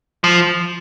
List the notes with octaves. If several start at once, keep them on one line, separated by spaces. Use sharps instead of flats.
F3